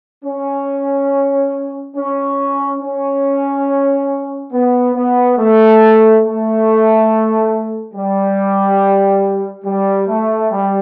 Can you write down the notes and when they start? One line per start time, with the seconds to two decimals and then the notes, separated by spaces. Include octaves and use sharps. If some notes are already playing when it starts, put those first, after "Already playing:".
0.25 C#4
1.96 C#4
2.81 C#4
4.52 B3
4.95 B3
5.37 A3
6.23 A3
7.94 G3
9.64 G3
10.07 A3
10.50 G3